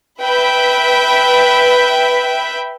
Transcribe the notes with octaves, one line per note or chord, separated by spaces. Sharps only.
B4 E5 G5 B5